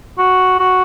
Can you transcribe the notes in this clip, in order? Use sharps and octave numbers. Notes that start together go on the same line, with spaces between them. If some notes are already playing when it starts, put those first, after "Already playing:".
F#4
F#4